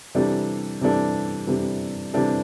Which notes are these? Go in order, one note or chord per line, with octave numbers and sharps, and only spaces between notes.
C3 E3 G3 D4 A4
C3 E3 G3 D4 A4
C3 E3 G3 D4 A4
C3 E3 G3 D4 A4